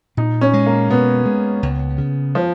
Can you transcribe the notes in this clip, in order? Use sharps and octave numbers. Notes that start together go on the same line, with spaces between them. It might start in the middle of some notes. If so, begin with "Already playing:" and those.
A#2 D#4
C#4
G#3
A#3
B2 B3
G#3
C#2
C#3
F3